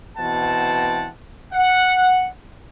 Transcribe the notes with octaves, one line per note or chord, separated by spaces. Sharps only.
B2 E3 C4 F#5 A5
F#5